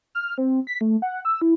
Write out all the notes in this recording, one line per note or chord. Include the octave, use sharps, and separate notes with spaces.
F6
C4
B6
A3
F#5
E6
E4